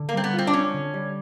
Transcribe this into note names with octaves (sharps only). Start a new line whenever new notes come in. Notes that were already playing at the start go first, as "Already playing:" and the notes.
Already playing: D3
A#3
G3 C4
B3
C4 F4
D4
C4 C#4
D3
G3